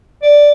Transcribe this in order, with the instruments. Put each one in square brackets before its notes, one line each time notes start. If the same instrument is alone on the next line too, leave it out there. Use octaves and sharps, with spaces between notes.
[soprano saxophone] D5